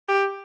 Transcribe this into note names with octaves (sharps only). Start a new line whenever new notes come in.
G4